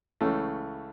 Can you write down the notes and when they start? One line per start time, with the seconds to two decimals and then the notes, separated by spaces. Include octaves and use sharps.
0.21 C#2 C#3 E3 A3